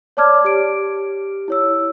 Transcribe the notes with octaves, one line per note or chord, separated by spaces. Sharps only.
C#5 D5 A5 D6 F6 G#6
G4 D7
E4 C#5 E6